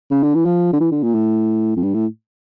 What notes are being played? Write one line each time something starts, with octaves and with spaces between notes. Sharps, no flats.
C#3
D3
E3
F3
D3
E3
D3
A#2
A2
F2
G2
A2